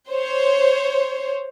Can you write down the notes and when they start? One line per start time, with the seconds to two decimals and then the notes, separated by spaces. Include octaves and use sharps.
0.10 C5 C#5